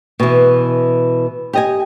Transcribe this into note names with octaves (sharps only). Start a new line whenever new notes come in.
B2 E3
G4 D#5 G#5